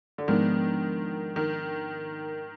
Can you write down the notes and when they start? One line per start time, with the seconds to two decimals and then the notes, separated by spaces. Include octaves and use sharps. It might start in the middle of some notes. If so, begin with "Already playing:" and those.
0.18 D3
0.28 G#2 D#3 F3 G#3 B3 D4
1.36 D#3